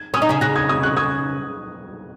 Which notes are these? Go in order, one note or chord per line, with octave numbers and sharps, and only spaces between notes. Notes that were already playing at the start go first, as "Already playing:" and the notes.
Already playing: G#6
C#4 D#6 G#6
D#4
C#3 C#4
C#3 C#4 F#6 A#6
D#6 G#6
D#6 G#6
C#6 F#6
D#6 G#6